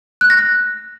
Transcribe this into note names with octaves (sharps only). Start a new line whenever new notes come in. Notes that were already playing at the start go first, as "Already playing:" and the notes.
F#6
A#6
F#6